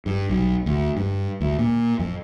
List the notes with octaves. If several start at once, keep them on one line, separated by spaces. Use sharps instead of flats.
G2
B1
D2
G2
D2
A#2
F2